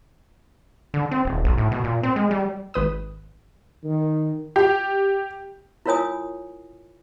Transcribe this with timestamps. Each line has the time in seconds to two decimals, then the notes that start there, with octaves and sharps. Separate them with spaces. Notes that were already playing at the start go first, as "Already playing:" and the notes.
0.94 D3
1.11 C4
1.25 D#1
1.44 B1
1.58 A2
1.71 B2
1.84 A#2
2.03 C4
2.16 G#3
2.31 G3
2.74 G#1 B4 D#6
3.84 D#3
4.56 G4
5.86 E4 F4 A#4 C#5 G#5 D#6